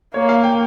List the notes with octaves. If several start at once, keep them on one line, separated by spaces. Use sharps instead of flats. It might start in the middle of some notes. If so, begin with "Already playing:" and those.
A#3 C#5
F5
G5